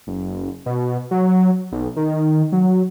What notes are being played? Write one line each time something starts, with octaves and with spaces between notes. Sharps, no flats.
F#1
B2
F#3
B1
D#3
F#3